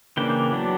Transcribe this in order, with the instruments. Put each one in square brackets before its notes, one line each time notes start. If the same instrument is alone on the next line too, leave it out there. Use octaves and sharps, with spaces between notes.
[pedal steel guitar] C#3 E3 A#3 D4 G5
F#3 B3 D4